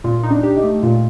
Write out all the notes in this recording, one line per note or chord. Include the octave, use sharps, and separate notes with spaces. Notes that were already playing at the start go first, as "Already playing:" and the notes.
A#2 F4
D#4
D4
G4
D#4
A3
A#2 F4